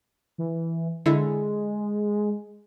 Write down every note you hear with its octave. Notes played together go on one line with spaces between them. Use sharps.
E3
D3 G#3 E4